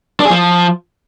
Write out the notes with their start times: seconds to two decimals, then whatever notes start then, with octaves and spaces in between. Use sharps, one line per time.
0.20 D4
0.25 G#4
0.30 F3